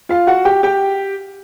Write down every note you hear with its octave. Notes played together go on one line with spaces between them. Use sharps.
F4 F5
F#4 F#5
G4 G5
G4 G5